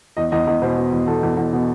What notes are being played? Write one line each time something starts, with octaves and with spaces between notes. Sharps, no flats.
E2 D#5
E2 D#5
E2 D#5
B2 C5
B2
E2
E2 A4
E2
E2
B2